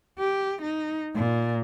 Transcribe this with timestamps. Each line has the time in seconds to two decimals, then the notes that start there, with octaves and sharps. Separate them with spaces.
0.19 G4
0.62 D#4
1.15 A#2